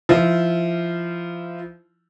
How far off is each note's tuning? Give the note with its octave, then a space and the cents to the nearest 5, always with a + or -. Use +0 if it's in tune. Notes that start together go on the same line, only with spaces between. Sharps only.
F3 -20 E4 -15